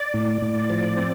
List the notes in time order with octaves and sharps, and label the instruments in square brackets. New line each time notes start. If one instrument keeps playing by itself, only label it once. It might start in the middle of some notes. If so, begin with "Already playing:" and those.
Already playing: [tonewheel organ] D5
A2
A2
F3
C4